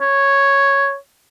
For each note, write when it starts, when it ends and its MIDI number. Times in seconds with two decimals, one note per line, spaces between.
0.01 0.96 73